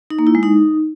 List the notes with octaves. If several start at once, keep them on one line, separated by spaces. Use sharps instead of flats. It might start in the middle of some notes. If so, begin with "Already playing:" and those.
D#4
A#3
E4
G#3
D#4